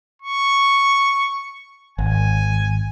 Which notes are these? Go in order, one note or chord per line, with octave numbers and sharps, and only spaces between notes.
C#6
G#1 G#5